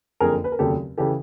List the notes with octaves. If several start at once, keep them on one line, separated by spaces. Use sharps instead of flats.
F#1 F2 D3 G#4 A#4
B4
A#4
F1 D#2 C#3 F#3 G4 A4
C#3 E3 G4 A4